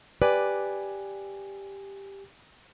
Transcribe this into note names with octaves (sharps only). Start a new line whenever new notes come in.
G4 B4 D5 G#5